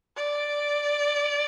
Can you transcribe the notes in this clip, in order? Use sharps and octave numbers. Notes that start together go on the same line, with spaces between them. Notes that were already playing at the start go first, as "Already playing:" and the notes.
D5